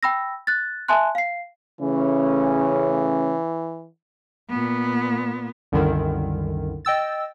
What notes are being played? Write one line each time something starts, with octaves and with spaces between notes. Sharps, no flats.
G5 B5 E6 A#6
F#6 A6
E5 G#5 A5 C6 F#6
F5 C7
C#3 E3 A3 C#4
A#2 B3
C2 F#2 D3 D#3
D#5 G5 E6 A6